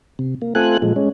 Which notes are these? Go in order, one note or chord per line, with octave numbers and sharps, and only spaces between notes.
C3
A#3
A3 C4 F4 A4 G#5 F#6
A#2 F3 G#3
G#3 C#4